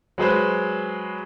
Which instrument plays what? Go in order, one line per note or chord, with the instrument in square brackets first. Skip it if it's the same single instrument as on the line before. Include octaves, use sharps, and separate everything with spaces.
[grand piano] F#3 G#3 B4 C5